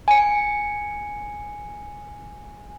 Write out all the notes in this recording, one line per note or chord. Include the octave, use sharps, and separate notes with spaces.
G#5 C#7